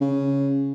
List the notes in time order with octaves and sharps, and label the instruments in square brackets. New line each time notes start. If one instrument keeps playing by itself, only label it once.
[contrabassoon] C#3